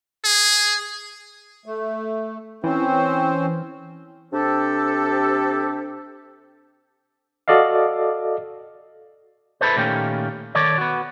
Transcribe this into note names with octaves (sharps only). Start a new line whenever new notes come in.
G#4
A3
E3 C4 C#4 C5
C3 D4 G4 A4
F#4 A4 D5 D#5 F5
E4 G#4 A4 B4 C5
A#2 D#3 A3 A#3 C#4 G4
D#3 A4 C#5 D5
B3 F#4